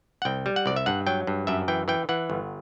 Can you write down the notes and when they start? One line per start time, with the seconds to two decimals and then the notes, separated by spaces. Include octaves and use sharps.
0.22 F#5
0.25 C2 G5
0.46 G3
0.56 F#5
0.66 C2 D5
0.76 E5
0.86 G2 F#5
1.07 F#3 G5
1.27 G2
1.47 F#2 E5
1.68 E3 G5
1.88 E3 G5
2.09 E3 F#5
2.30 G1